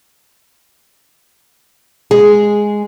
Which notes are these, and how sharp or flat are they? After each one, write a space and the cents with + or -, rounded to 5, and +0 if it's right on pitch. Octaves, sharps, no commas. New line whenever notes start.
G#3 +0 G#4 +0